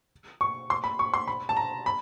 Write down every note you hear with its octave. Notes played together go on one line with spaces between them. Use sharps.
C#6
C6
B5
C#6
C6
B5
A5
A#5
B5